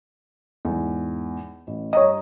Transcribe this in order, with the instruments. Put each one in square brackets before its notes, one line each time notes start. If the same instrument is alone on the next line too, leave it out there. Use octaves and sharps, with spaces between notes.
[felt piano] E2 G#2
A1
[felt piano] G2 A#5 D#6 [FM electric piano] C#5 D#5